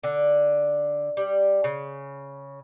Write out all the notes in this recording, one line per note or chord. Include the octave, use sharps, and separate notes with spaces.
D3
G3
C#3